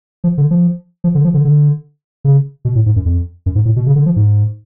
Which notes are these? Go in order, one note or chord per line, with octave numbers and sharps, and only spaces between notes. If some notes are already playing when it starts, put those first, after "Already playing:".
F3
D3
F3
F3
D3
F3
D3
D3
C#3
B2
A2
G#2
F#2
F2
F#2
G#2
A2
B2
C#3
D3
F3
G#2